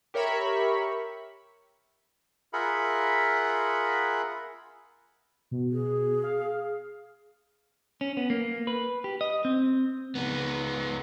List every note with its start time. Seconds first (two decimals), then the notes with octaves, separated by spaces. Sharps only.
0.14 G4 A#4 C#5 E5 B5 C#6
2.53 F4 G#4 A#4 E5 F#5 B5
5.51 B2
5.71 G#4
6.23 F5
8.01 C#4
8.17 B3
8.30 A#3
8.67 B4
9.04 G4
9.21 D#5
9.45 C4
10.15 C#2 B3